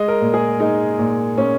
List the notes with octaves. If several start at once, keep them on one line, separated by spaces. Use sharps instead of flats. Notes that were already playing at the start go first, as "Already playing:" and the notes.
Already playing: G#3 D#5
A#4
A#2
G#4
G#3 D#4
A#2
A#2 C#4